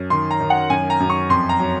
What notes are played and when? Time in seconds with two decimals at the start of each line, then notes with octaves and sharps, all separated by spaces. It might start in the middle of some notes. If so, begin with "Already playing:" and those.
Already playing: F#2
0.10 D#3 C6
0.31 A#5
0.40 D#3
0.50 F#5
0.70 F#2 G#5
0.90 A#5
1.00 F#2
1.10 C#6
1.29 F2 C6
1.49 A#5
1.59 F#3